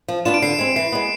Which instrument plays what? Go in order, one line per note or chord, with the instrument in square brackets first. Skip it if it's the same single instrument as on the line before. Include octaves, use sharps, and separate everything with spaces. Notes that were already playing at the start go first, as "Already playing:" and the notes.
[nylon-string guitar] F3
[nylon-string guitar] B3 D4 F4 [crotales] E7
[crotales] D7
[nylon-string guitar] D3 [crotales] C7
[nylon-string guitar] G#3 C4
[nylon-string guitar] E3 [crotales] C7
[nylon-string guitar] G#3 B3